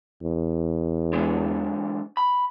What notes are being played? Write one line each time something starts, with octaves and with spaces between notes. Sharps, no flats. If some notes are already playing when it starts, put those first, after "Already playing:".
E2
D3 E3 G#3
B5